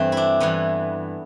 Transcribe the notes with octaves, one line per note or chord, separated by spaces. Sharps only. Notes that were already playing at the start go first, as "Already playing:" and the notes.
Already playing: G2 E3 A3 C4
D4 E4
G2 E3 B3